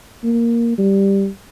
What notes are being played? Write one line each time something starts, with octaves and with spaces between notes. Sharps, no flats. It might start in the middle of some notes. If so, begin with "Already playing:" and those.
A#3
G3